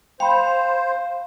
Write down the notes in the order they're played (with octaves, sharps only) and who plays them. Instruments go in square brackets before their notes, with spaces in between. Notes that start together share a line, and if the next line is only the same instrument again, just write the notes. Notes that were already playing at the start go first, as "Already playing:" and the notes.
[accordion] C5 [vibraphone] F5 [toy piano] G5 B5